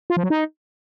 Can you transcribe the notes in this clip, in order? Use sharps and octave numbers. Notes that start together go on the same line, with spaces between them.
F4
F3
F#3
D#4